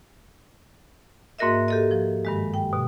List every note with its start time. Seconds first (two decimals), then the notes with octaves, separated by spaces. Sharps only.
1.39 G#2 A#3 F#4 A#4 D#5 E5
1.68 G4 A4 D#5
1.91 F3
2.25 G2 D#3 G#3
2.54 G5
2.73 B2